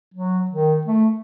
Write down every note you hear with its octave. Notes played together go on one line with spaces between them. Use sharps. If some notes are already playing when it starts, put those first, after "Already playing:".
F#3
D#3
A3